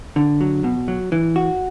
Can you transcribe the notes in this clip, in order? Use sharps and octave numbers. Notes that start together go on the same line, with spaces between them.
D3
F#3
B2
F#3
E3
F#4